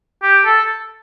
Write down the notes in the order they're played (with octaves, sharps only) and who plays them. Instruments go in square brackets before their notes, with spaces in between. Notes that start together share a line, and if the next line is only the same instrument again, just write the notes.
[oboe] G4
A4